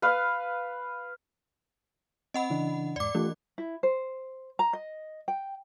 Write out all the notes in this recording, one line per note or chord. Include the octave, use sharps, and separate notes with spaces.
B4 F5
C4 D#5 F#5 B5
C#3 E3 D4
E2 G#2 D5 D6
E3 A3 F4 G4
E4
C5
A#5
D#5
G5